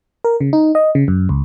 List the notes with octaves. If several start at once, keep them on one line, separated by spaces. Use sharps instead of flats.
A#4
C#3
D#4
D#5
C#3
F#2
C#2